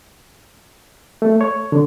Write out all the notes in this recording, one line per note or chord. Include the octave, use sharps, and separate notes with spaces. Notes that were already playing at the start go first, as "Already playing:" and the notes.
A3
C#5
D3